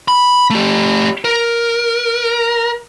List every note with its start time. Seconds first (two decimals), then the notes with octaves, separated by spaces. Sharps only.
0.08 B5
0.50 A3 G4
1.25 A#4